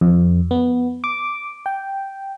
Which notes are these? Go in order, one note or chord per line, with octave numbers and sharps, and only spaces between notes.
F2
B3
D6
G5